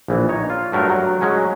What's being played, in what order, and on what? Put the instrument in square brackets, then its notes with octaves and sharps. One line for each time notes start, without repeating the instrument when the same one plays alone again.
[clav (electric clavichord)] A#1 E3
D#4 C#5
F4
G2 F#3 A3 A#4
F#3
F#3 G#3 C#4